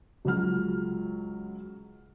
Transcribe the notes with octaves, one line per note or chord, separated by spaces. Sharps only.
C#2 F#3 F6